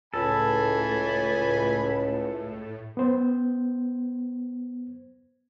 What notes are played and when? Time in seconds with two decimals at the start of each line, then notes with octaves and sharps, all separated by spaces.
0.14 C#2 A2 A4 G#5 B5
2.97 B3 C5